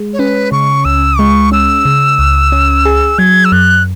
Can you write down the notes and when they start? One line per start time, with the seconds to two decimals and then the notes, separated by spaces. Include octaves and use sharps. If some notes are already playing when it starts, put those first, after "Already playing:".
Already playing: G#3
0.13 C#5
0.19 C#4 B4
0.52 C#3 C#6
0.85 C#2 E6
1.18 G#3 C#6
1.52 C#4 E6
1.85 C#3
2.19 C#2
2.52 C#4
2.85 G#4
3.19 F#3 G#6
3.45 E6
3.52 F#2 F#6